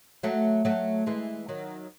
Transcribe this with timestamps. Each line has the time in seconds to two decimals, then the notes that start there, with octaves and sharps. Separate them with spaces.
0.23 F#3 A3
0.65 F#3 A3
1.06 E3 G#3
1.48 D#3 F#3